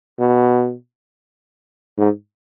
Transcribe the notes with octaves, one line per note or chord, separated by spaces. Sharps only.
B2
G#2